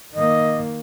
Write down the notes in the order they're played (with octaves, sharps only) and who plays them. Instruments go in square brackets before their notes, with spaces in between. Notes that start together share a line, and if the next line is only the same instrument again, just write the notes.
[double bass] D#3 A#3 [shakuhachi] D#5